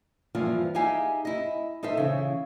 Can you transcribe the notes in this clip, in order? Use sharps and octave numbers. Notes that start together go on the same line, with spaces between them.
G2 E3 F3 A#3 F4
D#4 G4 G#4 E5 F5 G#5
E4 D#5
D#4 A4 C5 E5
C#3 E3